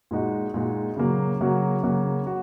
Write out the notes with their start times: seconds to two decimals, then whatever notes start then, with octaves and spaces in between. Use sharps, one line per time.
0.11 A#2 G#3 D#4 F#4
0.54 A#2 G#3 D#4 F#4
0.97 C#3 F#3 A#3 F#4
1.41 C#3 F#3 A#3 F#4
1.83 C#3 F#3 A#3 F#4
2.27 F#4